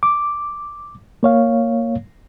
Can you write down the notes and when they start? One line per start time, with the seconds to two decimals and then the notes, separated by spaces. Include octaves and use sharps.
0.03 D6
1.23 A#3 C#5 F5